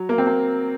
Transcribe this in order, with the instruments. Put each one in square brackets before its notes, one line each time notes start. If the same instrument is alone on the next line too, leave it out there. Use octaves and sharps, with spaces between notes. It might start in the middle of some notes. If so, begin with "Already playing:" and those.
Already playing: [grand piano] F#3
A#3
C4
A#3